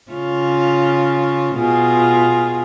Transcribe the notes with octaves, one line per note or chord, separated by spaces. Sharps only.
C#3 F4 C#5
B2 F4 G#4